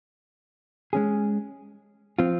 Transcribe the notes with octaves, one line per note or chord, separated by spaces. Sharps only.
G#3 C#4 G#4
F3 C4 F4